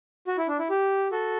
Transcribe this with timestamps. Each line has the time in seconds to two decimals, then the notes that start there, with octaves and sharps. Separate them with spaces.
0.27 F#4
0.38 E4
0.48 D4
0.59 E4
0.70 G4
1.12 F#4 A4